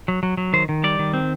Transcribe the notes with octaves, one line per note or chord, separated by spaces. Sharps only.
F#3
F#3
F#3
D#3 C5
D#3
G3 D5
D#3
C4